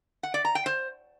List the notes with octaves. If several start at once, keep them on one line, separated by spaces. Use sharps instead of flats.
F#5
D5
A#5
G5
C5